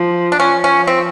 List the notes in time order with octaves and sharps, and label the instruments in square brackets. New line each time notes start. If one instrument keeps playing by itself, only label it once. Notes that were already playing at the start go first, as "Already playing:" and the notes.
Already playing: [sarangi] F3
[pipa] D4
[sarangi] F3 [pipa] C#4
[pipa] C#4
C4